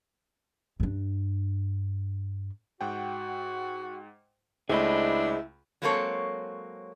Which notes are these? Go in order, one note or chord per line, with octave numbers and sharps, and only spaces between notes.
G2 D4
G#2 F#4 F#5 G5
C#2 A3 D4 E4 G#4 C5 D#5 B5
F#3 G#3 A#3 C4 A4 C#5